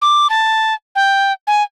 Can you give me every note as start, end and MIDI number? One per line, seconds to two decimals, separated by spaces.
0.02 0.27 86
0.30 0.74 81
0.95 1.32 79
1.47 1.63 80